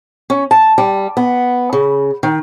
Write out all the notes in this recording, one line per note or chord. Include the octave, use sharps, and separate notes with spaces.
C#4
A5
G3
B3
C#3
D#3